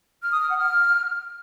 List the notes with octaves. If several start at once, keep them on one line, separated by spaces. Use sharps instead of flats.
F6
D#6
F6
F#5
F6